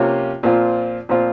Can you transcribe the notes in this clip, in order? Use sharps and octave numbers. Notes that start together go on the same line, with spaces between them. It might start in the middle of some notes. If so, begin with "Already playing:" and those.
Already playing: C3 F3 A#3 C#4 F4
A#2 F3 C4 F4
A#2 F3 C4 F4